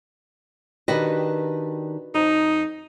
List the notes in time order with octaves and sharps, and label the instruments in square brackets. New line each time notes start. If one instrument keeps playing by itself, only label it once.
[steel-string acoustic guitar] D#3 D4 G4 [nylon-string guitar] F#4 B4 D#5
[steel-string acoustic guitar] F2 A#5 [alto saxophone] D#4